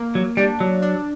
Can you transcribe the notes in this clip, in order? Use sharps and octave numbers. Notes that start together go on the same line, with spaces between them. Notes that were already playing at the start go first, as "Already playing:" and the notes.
Already playing: A#3
F#3
G3 D4
F#3
D4